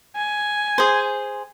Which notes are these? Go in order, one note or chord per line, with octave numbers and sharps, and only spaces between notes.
G#5
G#4 C5